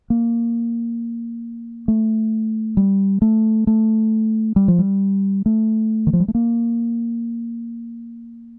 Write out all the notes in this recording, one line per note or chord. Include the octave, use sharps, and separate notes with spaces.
A#3
A3
G3
A3
A3
G3
F3
G3
A3
D#3
F3
G3
A3
A#3